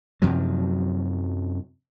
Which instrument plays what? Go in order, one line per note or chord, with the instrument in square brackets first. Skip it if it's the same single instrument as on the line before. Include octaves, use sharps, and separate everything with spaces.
[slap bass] F#2 C3 F3 F#3